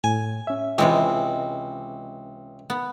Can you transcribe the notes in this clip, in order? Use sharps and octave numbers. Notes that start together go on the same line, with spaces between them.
A2 G#5
C#4 E5
C#2 C3 E3 G#3 C4
B3